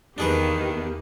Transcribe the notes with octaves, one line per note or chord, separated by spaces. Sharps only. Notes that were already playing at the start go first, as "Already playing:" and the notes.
E2 D#3 A#3 D4 G4 G#4 B4